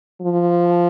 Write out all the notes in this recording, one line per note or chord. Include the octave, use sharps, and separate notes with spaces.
F3